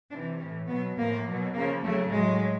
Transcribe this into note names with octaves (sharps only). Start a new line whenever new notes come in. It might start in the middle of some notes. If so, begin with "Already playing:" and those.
C3 E3 D4
A2 E3 C#4
B2 F#3 B3
A2 F3 A#3
B2 F#3
C#3 F3 A#3
C#3 F#3 A3
A2 F#3 G#3